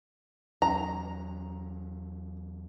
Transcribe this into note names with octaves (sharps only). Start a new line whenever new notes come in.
E2 F#3 C#4 A#5